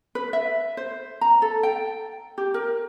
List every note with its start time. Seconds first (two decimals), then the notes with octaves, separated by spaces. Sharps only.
0.15 B4
0.33 E5
0.77 C5
1.21 A#5
1.42 A4
1.63 G5
2.38 G4
2.54 A#4